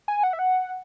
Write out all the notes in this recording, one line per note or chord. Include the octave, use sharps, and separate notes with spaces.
G#5
F#5
E5
F#5